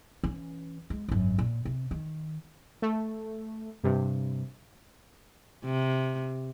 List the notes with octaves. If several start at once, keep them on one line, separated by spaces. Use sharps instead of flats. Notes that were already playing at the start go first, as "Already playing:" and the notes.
E3 C#4
G#3
G#1 F#2
A#2
C3
D#3
A3
G2 C3
C3